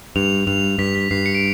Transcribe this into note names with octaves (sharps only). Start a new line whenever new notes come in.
G2 F7
G2 F7
G2 B6
B6
G2 C7
C#7
D7